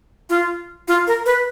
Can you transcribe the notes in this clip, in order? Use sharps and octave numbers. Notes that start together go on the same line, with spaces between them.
F4
F4
A#4
B4